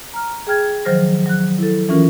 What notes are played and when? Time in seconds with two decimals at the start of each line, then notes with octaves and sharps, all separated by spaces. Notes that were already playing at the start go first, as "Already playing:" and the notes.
0.14 A#5 F6
0.47 G#4 G5 F6 G#6
0.85 D#3 F3 F#3 C5 F6 A#6
1.26 F#3 F#6
1.58 E4 A4
1.89 E3 C#4 F4 A#4